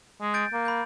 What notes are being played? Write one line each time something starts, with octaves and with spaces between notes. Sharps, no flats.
G#3
G6 A6 D7
A#3
B5 G6